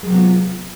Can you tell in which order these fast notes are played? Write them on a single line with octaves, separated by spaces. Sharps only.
G#3 F#3 C3 B3 F4